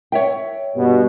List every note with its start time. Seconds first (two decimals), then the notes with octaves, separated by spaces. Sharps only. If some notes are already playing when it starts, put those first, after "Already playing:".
0.12 C#5 E5 G5
0.76 G2 B2